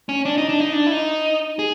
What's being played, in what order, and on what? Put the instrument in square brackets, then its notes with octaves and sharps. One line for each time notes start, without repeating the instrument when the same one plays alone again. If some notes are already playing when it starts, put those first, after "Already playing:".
[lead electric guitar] C#4
D4
D#4
D4
D#4
D4
E4
D#4
G#4